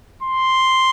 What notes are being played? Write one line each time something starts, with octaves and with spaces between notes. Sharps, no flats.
C6